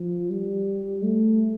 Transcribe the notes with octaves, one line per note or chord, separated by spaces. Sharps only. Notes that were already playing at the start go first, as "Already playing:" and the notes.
Already playing: F3
G3
A3